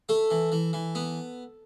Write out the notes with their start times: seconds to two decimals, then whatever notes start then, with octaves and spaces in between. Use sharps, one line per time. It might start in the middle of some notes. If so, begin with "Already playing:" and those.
0.09 A3 A4
0.31 E3
0.52 E3
0.73 E3
0.95 B3